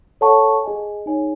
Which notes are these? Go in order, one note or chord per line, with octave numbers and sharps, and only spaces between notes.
A4 C#5 F#5 A5 C#6
G#4 D#5 G#5
D#4 G#4 C#5 G#5